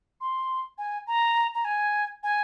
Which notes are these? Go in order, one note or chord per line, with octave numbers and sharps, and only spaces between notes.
C6
G#5
A#5
A#5
G#5
G#5